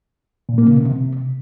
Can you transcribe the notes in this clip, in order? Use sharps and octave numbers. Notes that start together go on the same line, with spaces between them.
A#2
A#3
C#3
B2
C3